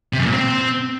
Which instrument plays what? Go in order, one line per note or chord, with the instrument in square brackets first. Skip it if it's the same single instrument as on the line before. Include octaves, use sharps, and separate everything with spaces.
[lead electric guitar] C3
F#2
A#2
C4